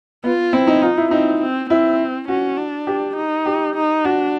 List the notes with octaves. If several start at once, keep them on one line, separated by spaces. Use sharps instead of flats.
B3 F4
C4 E4
D#4
D#4 F4
E4
C4 D#4
C4
C4 E4
C#4 F#4
D4
G4
D#4
G4
D#4
D4 F#4